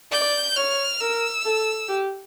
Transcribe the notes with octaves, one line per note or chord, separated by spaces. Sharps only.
D5 G6
C#5 F6
A#4 E6
A4
G4